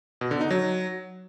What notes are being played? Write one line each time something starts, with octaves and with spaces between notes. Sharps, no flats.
B2
D3
D#4
F#3